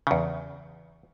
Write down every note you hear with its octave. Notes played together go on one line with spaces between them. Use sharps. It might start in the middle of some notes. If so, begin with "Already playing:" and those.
E2 C#3